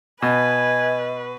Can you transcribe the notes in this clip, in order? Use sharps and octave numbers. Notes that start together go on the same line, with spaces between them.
B2 B4 D#5 G#5